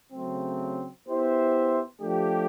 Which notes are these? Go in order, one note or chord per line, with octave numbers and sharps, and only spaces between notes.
C#3 F#3 A3 C4
B3 E4 G4 C5 E5
F3 A3 D4 G4